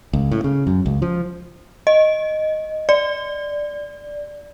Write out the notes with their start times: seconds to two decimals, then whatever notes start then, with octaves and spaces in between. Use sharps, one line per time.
0.13 C#2
0.31 A2
0.44 C#3
0.67 F#2
0.86 C#2
1.02 F3
1.87 D#5
2.89 D5